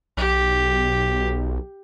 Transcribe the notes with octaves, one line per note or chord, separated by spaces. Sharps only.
B1 G4